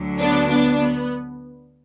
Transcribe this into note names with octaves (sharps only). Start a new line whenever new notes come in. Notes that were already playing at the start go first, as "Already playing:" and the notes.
Already playing: D2 D3 F#3
B3 D4
B3 D4
B3